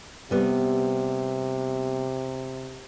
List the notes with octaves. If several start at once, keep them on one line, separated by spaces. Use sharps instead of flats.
C3 G3 B3